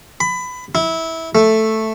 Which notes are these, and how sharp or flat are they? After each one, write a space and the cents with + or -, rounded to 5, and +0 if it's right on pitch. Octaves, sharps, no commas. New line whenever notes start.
B5 +20
E4 -20
A3 +0